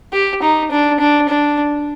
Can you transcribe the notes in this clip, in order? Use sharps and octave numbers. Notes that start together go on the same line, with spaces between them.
G4
D#4
D4
D4
D4